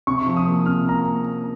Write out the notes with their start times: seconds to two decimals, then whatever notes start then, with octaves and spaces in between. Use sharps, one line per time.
0.07 C3 C#6
0.26 F3
0.37 D#6
0.47 A#3
0.66 C3 F6
0.85 A#3 A#5